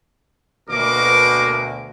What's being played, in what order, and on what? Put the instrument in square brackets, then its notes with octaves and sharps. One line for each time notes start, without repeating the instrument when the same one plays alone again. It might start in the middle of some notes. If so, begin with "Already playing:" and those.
[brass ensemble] D2 B2 [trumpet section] A#3 A#4 D6